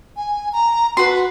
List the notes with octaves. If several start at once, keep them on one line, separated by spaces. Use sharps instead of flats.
G#5
A#5
F#4 B4 C6